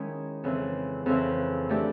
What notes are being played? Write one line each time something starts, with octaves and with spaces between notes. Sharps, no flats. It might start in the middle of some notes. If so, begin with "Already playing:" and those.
Already playing: D#3 G#3 C#4 E4
F2 C#3 E3
F2 C#3 E3
E3 A3 D4 G4